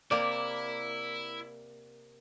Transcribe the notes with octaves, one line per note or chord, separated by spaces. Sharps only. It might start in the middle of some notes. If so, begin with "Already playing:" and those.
C3 A#3 E4 D5